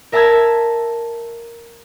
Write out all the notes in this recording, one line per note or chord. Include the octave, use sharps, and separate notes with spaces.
A#4 E5 A5 A#5 E6 G#6